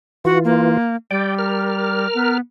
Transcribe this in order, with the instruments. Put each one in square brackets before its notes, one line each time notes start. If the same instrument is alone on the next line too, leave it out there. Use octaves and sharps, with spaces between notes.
[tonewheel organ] E3 F4 [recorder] F#4
[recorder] A#3
[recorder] G3 [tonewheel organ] D5 G5
[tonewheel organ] A#4 F6
[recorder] B3